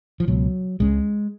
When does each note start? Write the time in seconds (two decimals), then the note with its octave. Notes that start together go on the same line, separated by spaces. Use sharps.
0.20 F3
0.28 C#2 B2 F#3
0.80 C#2 C#3 G#3